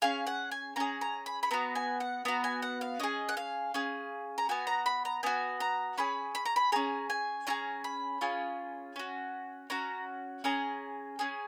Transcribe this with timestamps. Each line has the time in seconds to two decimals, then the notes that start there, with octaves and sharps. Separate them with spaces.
0.02 C#4 G#4 F5
0.27 F#5
0.51 G#5
0.76 C#4 G#4 A#5
1.01 A#5
1.26 B5
1.43 B5
1.51 B3 F#4 A#5
1.75 G#5
2.00 F#5
2.25 B3 F#4 A#5
2.44 G#5
2.62 F#5
2.81 F5
3.00 C#4 G#4 D#5
3.29 F#5
3.37 F5
3.74 C#4 G#4
4.38 A#5
4.49 B3 F#4 G#5
4.67 A#5
4.86 B5
5.05 A#5
5.23 B3 F#4 G#5
5.60 A#5
5.98 C#4 G#4 B5
6.35 B5
6.45 A#5
6.56 B5
6.72 C#4 G#4 A#5
7.10 G#5
7.47 C#4 F4 G#4 A#5
7.84 B5
8.21 C#4 F4 G#4
8.96 C#4 F#4
9.70 C#4 F#4 A#5
10.44 C#4 G#4 A#5
11.19 C#4 G#4